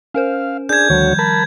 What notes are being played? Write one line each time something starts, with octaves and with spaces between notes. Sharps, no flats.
C#4 A#4 C5 F5
D4 G#4 G6 G#6
D2 D#3 F3 G3 F#4 C#5
A#4 A5 B5